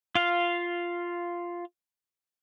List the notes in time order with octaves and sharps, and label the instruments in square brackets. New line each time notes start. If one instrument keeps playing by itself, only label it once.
[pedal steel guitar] F4 F5